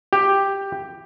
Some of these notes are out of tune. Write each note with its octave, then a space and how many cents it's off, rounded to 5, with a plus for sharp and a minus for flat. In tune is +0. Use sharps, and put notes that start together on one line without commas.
G4 +5